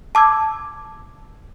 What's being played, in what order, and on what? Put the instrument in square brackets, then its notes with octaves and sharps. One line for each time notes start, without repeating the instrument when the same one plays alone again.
[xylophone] A5 D6 E6 G#6